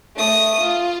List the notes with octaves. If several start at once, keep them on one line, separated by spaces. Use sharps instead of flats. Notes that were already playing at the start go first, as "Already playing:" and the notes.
A3 D#6
F4